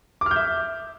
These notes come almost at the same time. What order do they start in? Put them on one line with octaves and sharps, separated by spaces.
D6 F6 G6 E5